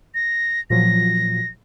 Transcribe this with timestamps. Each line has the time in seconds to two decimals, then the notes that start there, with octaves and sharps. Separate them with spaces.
0.15 A#6
0.70 A#2 F3 F#3 A#6